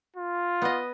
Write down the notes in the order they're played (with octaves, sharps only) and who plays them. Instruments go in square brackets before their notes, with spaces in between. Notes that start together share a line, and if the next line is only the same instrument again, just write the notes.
[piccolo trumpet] F4
[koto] B3 D#5